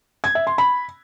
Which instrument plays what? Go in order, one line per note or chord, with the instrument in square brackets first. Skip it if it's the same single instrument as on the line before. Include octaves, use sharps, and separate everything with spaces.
[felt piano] G#6
E5
C6
B5